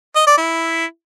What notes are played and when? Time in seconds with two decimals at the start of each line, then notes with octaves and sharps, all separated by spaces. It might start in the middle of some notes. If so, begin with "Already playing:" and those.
0.16 D#5
0.27 D5
0.38 E4